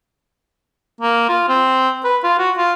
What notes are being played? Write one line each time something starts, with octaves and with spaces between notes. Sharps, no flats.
A#3
F4
C4
B4
F4
F#4
F4